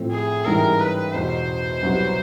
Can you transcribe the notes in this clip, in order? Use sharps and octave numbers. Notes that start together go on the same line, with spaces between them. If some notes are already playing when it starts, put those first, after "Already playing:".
Already playing: A2 F3 A3 C4
G#4
A1 G#2 E3 G3 A#4
B4
E2 B2 G#3 C5
C2 B2 F#3 B3